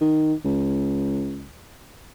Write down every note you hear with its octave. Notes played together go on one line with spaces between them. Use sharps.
D#3
C#2